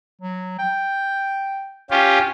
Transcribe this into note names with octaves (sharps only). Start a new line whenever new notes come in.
F#3
G5
C#4 F4 G4